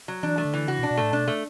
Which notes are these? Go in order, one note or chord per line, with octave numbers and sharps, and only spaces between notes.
F#3
E3 D4
A3
D3
E3
C#3 F#4
B2
D4
B2
A2 A3
B2 D4
A3